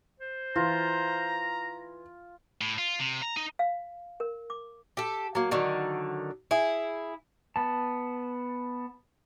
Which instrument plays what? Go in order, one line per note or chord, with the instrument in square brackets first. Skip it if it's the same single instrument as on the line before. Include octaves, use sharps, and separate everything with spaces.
[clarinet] C5
[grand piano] E3 [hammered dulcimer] F4 [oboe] A#5
[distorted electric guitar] A2
F4
C3
A#5
D#4
[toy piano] F5
A#4
D6
[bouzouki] G4 A4
F#3 A#3
D3 D#3 F#3
E4 G#4
[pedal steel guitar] B3 A5